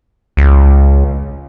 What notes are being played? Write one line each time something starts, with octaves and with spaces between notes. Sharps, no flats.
C#2